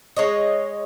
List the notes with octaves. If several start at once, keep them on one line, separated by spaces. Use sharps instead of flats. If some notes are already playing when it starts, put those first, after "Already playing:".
G#3 C#5 D#5